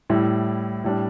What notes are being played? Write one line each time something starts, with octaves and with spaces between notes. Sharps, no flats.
A2 G3 E4
A2 G3 D4